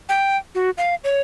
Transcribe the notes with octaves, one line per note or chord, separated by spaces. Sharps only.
G5
F#4
F5
C#5